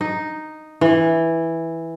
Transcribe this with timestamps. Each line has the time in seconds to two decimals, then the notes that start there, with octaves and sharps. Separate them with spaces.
0.01 D#4
0.81 E3